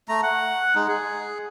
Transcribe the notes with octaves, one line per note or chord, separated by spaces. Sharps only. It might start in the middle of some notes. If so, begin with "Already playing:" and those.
A3 A#5
F#5
G#3 D#4
G#4